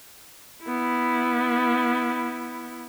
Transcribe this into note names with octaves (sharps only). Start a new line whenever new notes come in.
B3 E4